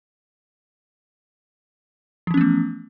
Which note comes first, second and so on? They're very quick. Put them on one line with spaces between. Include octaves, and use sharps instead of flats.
F3 E3 C#4 B3 A3